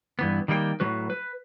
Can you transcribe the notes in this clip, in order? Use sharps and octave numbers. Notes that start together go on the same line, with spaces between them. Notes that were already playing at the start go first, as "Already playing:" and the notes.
G2 E3 B3
D#3 G3 A#3 G4 G5
A2 F#3 F#4 B4
B4